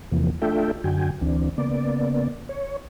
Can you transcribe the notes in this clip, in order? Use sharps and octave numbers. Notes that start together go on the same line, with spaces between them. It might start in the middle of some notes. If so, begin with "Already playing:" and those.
E2 C3 E3 F3 A#3
A3 D4 F4 A4 E5 G5
F#2 D3 F#4 G5 G#5
D2 E3 C4 D4
C#3 A#3 B3 D5
C#5